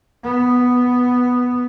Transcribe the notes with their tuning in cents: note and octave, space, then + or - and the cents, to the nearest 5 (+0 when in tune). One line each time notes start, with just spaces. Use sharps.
B3 +0